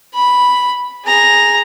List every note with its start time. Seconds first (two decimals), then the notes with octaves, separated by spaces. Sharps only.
0.14 B5
1.05 G#4 A#5